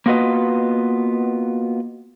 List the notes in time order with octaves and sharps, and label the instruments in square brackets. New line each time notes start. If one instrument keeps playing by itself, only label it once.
[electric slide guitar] A#3 B3 F4 F#4 B4 D#5